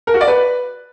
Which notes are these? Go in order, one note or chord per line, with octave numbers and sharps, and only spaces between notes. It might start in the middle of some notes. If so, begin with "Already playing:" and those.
A#4
F#4
D5
B4